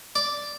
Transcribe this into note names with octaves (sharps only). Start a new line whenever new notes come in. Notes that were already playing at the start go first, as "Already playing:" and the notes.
D5